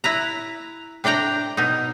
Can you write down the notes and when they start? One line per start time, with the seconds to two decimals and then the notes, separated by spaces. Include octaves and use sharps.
0.04 E4 B4 A#5
1.04 C3 D4 D5 G5 A#5
1.57 B2 D#4